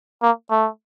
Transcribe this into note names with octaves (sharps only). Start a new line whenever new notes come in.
A#3
A3